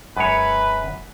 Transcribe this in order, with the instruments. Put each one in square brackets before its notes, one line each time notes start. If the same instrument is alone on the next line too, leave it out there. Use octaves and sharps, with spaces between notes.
[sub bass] E1 [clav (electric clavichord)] F#2 G#3 C#5 [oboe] B4